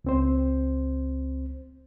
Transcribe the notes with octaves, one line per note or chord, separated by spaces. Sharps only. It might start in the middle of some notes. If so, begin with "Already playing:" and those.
C#2 C4 C5